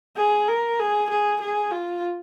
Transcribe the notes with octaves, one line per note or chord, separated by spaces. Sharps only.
G#4
A#4
G#4
G#4
G#4
F4